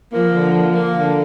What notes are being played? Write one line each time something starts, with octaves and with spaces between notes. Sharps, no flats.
F3 A#3
D3
A#3
A#3
D3